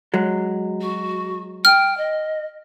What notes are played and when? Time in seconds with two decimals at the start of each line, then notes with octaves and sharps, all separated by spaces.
0.14 F#3 G#3
0.81 F#4
1.65 G5 F6
1.97 D#5